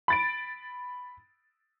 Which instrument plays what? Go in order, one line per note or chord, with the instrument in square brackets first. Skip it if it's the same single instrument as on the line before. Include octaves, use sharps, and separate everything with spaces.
[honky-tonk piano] B5 A6 D7